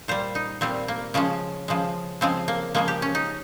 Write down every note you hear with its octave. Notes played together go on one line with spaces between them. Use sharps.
A#2 G3 C5
D#4
A#2 G3 C4
A#3
C#3 F3 G#3 C#4
C#3 F3 G#3
C#3 F3 G#3 C4
A#3
C#3 F3 G#3 A#3
G4
C#4
D#4